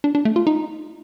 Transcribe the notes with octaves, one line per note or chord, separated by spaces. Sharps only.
D4
D4
A3
F4
D#4